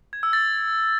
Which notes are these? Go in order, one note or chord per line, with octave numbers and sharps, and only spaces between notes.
G#6
E6
A6